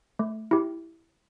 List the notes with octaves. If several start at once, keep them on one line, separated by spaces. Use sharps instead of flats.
A3
E4 G4